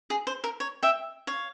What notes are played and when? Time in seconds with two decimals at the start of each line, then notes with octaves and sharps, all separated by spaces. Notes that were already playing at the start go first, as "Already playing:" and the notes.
0.10 G#4
0.27 C5
0.44 A#4
0.60 C#5
0.83 E5 G5
1.27 C#5 F5